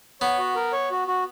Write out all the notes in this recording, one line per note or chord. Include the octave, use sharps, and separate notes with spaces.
B3 C#5
F#4
A#4
C#5
F#4
F#4